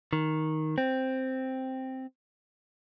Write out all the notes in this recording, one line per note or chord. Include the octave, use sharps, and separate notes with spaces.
D#3
C4